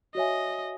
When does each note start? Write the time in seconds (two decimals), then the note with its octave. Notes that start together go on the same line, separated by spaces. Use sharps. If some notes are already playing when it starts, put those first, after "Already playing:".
0.15 F#4 C#5 D#5 E5 G#5